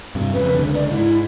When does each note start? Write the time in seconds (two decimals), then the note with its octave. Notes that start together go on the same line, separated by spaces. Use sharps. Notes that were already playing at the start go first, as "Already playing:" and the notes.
0.15 G2 C3
0.34 F2 C#3 B4
0.54 C#2 D3
0.75 D5
0.91 G#2 E4